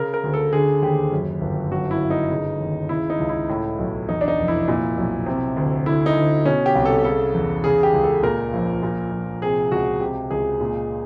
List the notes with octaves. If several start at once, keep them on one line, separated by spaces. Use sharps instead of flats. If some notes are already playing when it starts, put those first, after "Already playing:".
Already playing: C#3 A#4
A#4
D2
A4
D3 G#4
D#2 G4
F#2
G1
F#2 F#4
E4
G1
D#4
C#3
D#2
C#3 E4
D#4
C#2
E4
A2
B1
E2 D#4
D4
D#4
F1
E4
A#2
B1
C3
D2
D3 E4
D#4
D2
B2 C#4
G4
C2
A4
C#3 A4
E2
C#3 G#4
G4
C#2
A4
A#2 A#4
A#1
A#2
A#1
C3 G#4
C#2 F#4
C3 G4
C#2 G#4
A#2